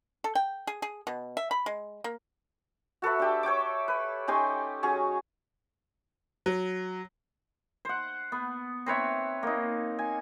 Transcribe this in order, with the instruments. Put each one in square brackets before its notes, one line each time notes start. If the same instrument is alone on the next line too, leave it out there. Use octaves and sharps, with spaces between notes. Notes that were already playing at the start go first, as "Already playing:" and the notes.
[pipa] A4
G5
G#4
G#4
B2
E5
B5
G#3
A#3
[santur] F#4 A4 B4 E5
D4 G4
C#5 G5 C#6 D6
B4
C#4 D#4 G4 C6
F#3 C#4 G#4 C#5
[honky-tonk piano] F#3
[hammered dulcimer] C5 F#5
B3
C4 B4 C#5 E5
A#3 D#4
G#5